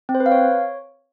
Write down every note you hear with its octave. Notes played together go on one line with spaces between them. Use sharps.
C4
C5
B4
F5
C#5